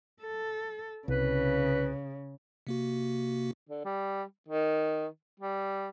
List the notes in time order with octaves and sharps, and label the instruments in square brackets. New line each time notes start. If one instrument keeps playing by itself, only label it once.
[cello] A4
[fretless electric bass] C2 [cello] C#3 [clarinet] B4
[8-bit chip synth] C3 A#3 F#4
[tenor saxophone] D3
G3
D#3
G3